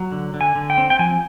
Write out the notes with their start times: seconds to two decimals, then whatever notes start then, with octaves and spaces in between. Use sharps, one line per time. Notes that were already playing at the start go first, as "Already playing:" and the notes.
Already playing: F#3
0.12 D3
0.34 D3
0.41 G#5
0.55 D3
0.70 G5
0.78 C4
0.90 G5
0.99 F3 G#5